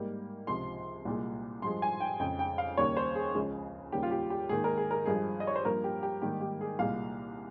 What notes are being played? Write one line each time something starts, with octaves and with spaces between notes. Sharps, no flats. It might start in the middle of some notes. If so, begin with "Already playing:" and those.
Already playing: G#2 G3 A#3
C#2 C3 F3 C6
C2 A#2 G#3
G2 F3 G#3 C6
G#5
G5
F2 C#3 G#3 G5
G5
F5
D#2 C#3 G3 A#3 C#5
C5
G#4
C#2 C#3 F3 G#3
D#2 C#3 G3 A#3 G4
F4
G4
G4
G#2 D#3 A#3 G#4
A#4
G#4
A#4
G2 F3 G#3 G#4
D#5
C#5
C5
G2 F3 A#3 A#4
G4
G4
G#2 D#3 G3 A#3 G4
G4
G#4
C2 A#2 G#3 F5